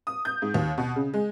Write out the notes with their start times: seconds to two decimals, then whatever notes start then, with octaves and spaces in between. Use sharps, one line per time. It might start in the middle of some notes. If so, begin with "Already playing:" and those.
0.07 D#6
0.25 G6
0.42 G#2
0.54 D#2
0.78 B2
0.96 C#3
1.14 G#3